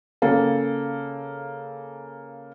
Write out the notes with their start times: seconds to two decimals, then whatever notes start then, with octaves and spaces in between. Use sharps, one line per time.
0.22 C#3 A#3 A4